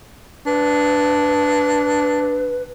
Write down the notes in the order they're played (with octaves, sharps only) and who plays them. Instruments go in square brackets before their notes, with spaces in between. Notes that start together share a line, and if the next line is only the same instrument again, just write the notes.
[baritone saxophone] D4 [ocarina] B4